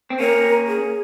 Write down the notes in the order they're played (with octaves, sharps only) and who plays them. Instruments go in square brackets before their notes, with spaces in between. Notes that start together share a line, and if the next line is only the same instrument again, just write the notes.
[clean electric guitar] C4
[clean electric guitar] A#3 C#4 [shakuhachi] A#4
[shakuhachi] G#4